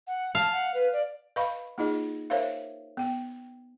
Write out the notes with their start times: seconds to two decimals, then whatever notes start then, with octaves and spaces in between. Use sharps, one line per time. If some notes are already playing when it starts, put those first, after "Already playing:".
0.07 F#5
0.35 F5 A5
0.52 F#5
0.74 B4
0.93 D5
1.36 B4 D#5 F5 B5 C#6
1.78 A#3 D#4 F4 G#4 D#5
2.30 A#4 C5 C#5 E5 F5
2.97 B3 G5